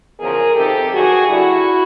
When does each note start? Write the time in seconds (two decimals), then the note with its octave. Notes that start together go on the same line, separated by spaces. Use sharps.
0.20 E2 C#3 F3 G#4 A#4
0.56 F2 C3 D#3 G4 A4
0.91 G2 D#3 F#3 F#4 G#4
1.27 G2 D3 G3 E4 F#4